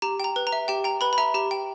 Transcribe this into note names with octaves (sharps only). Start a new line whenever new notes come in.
G4 A#5
G5 A#5
B4
A#5
E5
G4 G5
G5 A#5
B4 B5
B5
E5 A#5
G4 A#5
G5